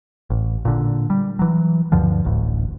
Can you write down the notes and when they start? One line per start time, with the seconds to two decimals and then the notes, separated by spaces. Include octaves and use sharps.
0.30 A1
0.65 A#2 D3
1.10 G3
1.39 E3 F#3
1.92 D2 G2 D3 F3
2.25 D1 A1 D2